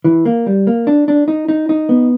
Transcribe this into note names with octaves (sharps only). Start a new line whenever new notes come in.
E3
A#3
G3
A#3
D4
D4
D#4
D#4
D#4
B3